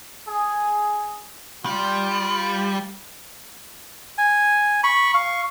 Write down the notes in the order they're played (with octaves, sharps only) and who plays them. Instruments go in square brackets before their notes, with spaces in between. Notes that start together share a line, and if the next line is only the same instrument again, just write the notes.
[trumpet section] G#4
[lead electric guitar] G3 [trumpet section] F4
[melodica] G#5
B5 C#6
F5 C#6